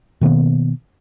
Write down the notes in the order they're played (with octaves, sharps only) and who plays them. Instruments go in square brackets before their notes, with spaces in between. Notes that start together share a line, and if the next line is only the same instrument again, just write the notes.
[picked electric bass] B2 D#3 A#3 B3